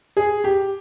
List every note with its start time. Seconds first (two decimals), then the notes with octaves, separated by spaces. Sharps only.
0.17 G#4
0.44 G4